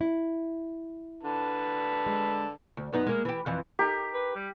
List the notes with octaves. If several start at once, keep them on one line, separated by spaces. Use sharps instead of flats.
E4
D3 B4 A5
G#3
D2
F#2 B3 D#4
G#3 A#3
E3 G4
F2 E3
D#4 G4 A#4
B4
G3